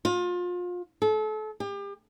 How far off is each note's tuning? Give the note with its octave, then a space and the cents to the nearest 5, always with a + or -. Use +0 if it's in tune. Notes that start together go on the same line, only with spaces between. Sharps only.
F4 +30
A4 -35
G4 +35